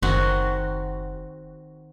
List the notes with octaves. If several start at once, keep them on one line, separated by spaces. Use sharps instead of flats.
F#1 D#3 C4 F#4